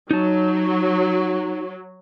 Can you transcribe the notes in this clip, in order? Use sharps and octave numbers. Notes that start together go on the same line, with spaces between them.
F#3 D#4 A5